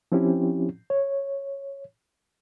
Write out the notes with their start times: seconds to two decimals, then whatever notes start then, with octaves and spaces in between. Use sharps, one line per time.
0.12 F3 C4 C#4 E4 G4
0.90 C#5